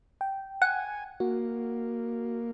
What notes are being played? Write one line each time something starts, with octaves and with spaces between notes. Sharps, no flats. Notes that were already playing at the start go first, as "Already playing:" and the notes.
G5
F#5 G#5
A#3 F#4